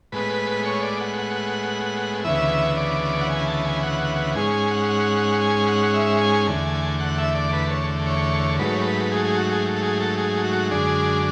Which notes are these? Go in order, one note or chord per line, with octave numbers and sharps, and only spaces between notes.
A2 G#3 B3 B4
C#5
D5
F#5
F#5
D2 C#3 E3 B3 E5
D5
F#5
G#5
A5
G#5
F#5
G#2 G#3 C#4 G#5
G#5
F#5
F#5
G#5
F#5
E5
G#5
E2 D3 A3 G#5
F#5
E5
D5
B4
C#5
C#5
G#2 F#3 A3 B4
C#5
B4
G#4
G#4
F#4
G#4
A4
G#4
A4
G#4
F#4
F#2 D3 G#3 D4 G#4